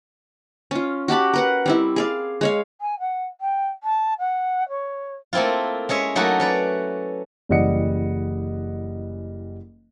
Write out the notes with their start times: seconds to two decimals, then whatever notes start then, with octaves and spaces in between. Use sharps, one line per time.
0.71 C#4 F4
1.08 F#4 G4 A5 B5
1.33 A#4 B4 F#5
1.66 G3 C4 E4
1.96 G#4 D5 F5
2.41 G#3 C#5 F5
2.81 G#5
3.00 F#5
3.41 G5
3.83 A5
4.19 F#5
4.69 C#5
5.33 A3 A#3 C4 E4 F4
5.89 G#3 C#4 C#5 E5
6.15 F#3 A3 A#3 D#4 E4 F#4
6.40 C#4 B4 D5
7.49 F#1 E3 G3 D#5 F#5 C#7